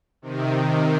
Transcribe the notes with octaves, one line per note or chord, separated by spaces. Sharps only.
C3 D#3
C3